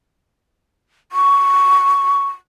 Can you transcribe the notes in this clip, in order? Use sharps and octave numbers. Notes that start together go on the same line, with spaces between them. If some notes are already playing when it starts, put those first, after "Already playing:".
C#6